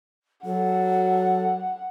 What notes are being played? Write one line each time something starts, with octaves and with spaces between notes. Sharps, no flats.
F#3 A4 F#5